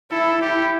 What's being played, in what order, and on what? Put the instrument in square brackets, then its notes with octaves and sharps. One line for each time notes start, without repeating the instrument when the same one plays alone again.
[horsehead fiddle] E4 [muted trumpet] A4
[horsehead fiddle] E4 [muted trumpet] G4